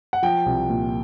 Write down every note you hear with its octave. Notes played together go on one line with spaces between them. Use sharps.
F#5
F3 G5
C2
A#2